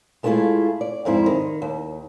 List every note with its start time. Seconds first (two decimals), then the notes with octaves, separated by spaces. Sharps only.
0.23 G#3 A3 B3 E4 F4 G#4
0.81 D5
1.05 F2 G#2 C4 E4
1.26 D#3
1.62 D#2